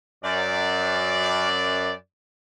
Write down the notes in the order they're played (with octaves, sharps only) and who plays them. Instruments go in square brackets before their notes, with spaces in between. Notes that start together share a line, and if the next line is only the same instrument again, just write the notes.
[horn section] F#2 D5